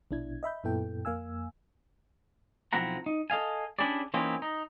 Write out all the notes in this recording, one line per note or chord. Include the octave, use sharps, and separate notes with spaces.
A#1 B2 D4 E4 G#6
D#5 E5 B5 G6
F#2 A#2 B3 E4 A4 G5
F2 A#3 F5 G#5 E6
B1 F3 C4 E4 F#5 A#5
D#4
A4 D#5 F5 G#5
C#4 D4 E4 G4 G#4 D5
E3 A#3 C4 C#4 D#4 E4
D#4